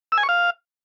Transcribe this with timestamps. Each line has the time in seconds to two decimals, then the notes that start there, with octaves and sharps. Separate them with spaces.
0.12 E6
0.18 G#5
0.23 C#6
0.29 F5